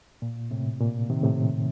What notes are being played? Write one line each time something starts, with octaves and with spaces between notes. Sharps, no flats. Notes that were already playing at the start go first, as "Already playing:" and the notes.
A#2
A2 C3
A#2
C3 D#3
A2 C3